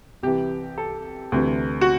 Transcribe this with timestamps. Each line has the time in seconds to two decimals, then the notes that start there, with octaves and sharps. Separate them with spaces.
0.23 C2 C3 E3 G4
0.78 A4
1.32 D2 C3 E3
1.81 F#4